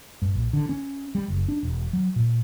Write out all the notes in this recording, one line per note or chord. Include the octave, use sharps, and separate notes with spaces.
G2
A#1
D3
C#4
G3
F#1
D4
E1
F#3
A#2